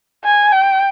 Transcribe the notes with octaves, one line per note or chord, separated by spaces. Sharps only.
G#5
G5